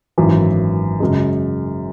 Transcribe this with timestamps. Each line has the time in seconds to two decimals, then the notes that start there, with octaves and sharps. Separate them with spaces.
0.18 G#1 F#2 E3
1.00 F#2 C#3 G#3